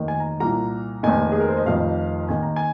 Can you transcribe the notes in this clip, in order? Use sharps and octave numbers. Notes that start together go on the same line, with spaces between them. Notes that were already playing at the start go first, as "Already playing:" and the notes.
Already playing: F1 D#2 D#3
G#5
A#5
C2 A#2 A#5
F1 D#2 D#3 G#5
G#4
A#4
C5
D#5
F1 F2 D#3 F5
D#2 D#3 G#5
A#5
G#5